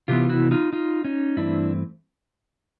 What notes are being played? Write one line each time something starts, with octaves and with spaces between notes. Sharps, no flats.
C3 E3 B3 F4 G4
E4 F#4
D#4 F4
D#4 F4
C#4 D#4
G2 E3 A3 C4 D4 E4